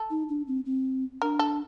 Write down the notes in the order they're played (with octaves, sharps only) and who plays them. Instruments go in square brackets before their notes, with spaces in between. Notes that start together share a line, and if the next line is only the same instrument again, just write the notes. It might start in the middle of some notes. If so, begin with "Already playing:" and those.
Already playing: [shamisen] A4
[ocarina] D#4
D4
C4
C4
[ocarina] D4 [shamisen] A#4
[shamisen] A4